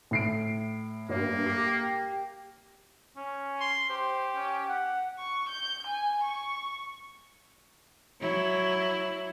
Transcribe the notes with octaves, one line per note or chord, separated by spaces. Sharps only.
A2 C7 D7
G2 A#3
G4
C#4
C6
G4 C5
C#4
F#5
C#6
G6
G#5
C#6
F#3 E4